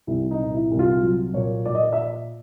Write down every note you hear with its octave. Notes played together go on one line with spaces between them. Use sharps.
C2 E4
D#4
A#2
E4
C2
F4
F#3
A#2 C#5
A#2 D5
D#5
D5
E5